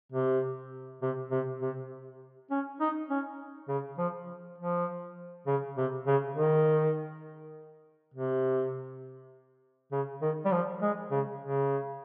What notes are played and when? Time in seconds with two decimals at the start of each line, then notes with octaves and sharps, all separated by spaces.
0.12 C3
1.02 C3
1.31 C3
1.61 C3
2.50 C#4
2.80 D#4
3.10 C#4
3.68 C#3
3.98 F3
4.58 F3
5.47 C#3
5.77 C3
6.07 C#3
6.35 D#3
8.14 C3
9.92 C#3
10.21 D#3
10.45 G3
10.52 F3
10.82 G#3
11.11 C#3
11.41 C#3